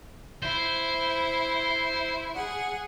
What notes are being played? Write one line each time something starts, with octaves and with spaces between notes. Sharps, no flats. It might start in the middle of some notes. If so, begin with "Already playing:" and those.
E4 C5
G#4 F#5